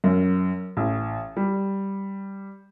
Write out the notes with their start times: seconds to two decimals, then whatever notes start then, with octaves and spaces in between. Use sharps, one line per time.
0.04 F#2
0.77 A1
1.37 G3